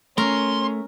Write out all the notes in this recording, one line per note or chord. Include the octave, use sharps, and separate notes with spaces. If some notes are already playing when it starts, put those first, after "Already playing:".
A3 C#4 A#4 C6